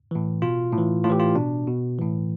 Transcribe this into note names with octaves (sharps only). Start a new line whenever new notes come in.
A2 E3
B2 F4
A2 E3
A2 F4
E3 G4
F4
B2 D4
B2
A2 E3